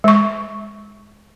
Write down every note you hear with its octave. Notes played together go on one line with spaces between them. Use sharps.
G#3 C#6